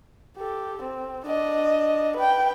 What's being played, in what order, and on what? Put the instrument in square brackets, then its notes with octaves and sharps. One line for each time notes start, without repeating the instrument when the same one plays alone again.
[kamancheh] G4 A4
C4
D4 D#5
B4 G5